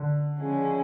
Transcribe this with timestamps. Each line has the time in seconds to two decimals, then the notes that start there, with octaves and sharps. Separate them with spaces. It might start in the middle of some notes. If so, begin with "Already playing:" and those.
Already playing: D3
0.39 C#3 F3 G#3 C#4